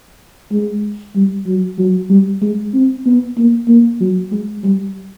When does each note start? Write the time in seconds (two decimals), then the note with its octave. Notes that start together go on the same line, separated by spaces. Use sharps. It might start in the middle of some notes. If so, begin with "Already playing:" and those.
0.51 G#3
1.15 G3
1.46 F#3
1.79 F#3
2.10 G3
2.42 G#3
2.74 C4
3.06 B3
3.37 A#3
3.68 A#3
4.00 F#3
4.31 G#3
4.64 G3